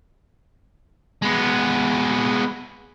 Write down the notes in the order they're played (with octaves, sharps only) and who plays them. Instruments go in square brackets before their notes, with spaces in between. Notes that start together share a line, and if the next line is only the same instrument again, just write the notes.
[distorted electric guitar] G#3 B3